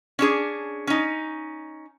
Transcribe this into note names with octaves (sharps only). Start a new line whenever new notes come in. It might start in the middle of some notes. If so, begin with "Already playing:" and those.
C#4 D4 G#4
C#4 D#4